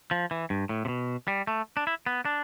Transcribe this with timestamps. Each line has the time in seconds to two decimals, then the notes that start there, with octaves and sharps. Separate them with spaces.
0.11 F3
0.31 E3
0.50 G2
0.69 A2
0.85 C3
0.88 B2
1.28 G3
1.47 A3
1.77 D4
1.87 E4
2.06 B3
2.25 D4